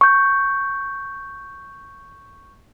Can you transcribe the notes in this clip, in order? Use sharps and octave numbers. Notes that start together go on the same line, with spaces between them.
C#6 G6